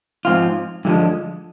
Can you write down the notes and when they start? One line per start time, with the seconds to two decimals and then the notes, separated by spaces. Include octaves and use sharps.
0.25 G#2 F3 C4 F4
0.85 G2 D3 F3 G#3